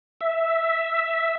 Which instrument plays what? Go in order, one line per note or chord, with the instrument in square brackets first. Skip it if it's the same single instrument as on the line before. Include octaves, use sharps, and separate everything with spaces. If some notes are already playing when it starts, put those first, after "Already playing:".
[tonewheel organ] E5